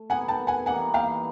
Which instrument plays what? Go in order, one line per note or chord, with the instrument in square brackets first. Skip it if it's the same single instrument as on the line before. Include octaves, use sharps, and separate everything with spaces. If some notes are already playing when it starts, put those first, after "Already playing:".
Already playing: [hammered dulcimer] A3
[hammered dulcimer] D#3 G3 B3 [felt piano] F#5 G#5
[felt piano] G5 A5
F#5 G#5
[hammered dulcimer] E3 G3 A#3 D#4 [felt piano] F#5 G#5
[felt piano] F5 G5